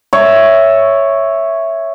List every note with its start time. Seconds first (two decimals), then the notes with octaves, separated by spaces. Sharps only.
0.13 C#5 E5